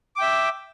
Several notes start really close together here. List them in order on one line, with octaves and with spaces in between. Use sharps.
D6 G5 E5